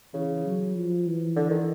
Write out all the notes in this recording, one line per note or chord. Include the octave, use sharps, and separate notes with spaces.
C#3 E3
F#3
F3
E3
D3
D#3